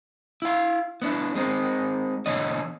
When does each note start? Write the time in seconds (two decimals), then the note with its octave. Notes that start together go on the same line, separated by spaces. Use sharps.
0.42 E4 F5
1.02 B3 D4 E4
1.35 G#3 C4 D#4
2.26 B2 D3 E3 C#5 D#5